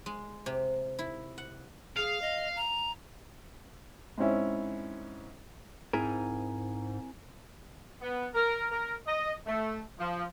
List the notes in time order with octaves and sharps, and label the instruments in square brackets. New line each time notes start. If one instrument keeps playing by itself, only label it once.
[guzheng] G#3
C3
E4
F#5
[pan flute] G#4 [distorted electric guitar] F5
[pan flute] D#5
A#5
[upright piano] G#2 C4 C#4 E4
[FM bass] G#2 [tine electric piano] C4 G#5 [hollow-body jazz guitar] E4 G#4 A#4
[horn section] B3
A#4
A#4
D#5
A3
F3